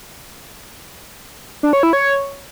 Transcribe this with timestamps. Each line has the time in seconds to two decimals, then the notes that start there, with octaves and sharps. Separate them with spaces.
1.63 D4
1.73 C#5
1.83 E4
1.93 C#5